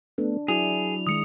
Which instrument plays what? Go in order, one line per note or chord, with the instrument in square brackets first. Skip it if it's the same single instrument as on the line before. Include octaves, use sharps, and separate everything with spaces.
[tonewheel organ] A3 B3 [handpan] D4
[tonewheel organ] F#3 [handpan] E4 D5 [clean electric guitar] G#4 [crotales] F7
[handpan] D#3 G#3 [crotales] D#6 C#7